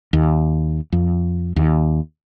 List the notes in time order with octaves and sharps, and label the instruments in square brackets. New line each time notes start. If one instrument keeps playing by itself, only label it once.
[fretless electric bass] D#2
F2
D#2